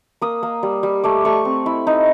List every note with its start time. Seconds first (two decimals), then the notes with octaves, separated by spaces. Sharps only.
0.21 A#3 D#6
0.43 A#3
0.63 G3
0.83 G3
1.04 A3 D6
1.25 A3 C#6
1.45 C4
1.66 E4
1.87 D#4